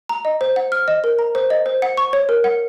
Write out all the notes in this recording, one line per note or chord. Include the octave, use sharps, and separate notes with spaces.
A#5
D#5
C5
F#5
F6
D#5
A#4
A#5
C5
D#5
C5
F#5
C#6
C#5
A#4
F#5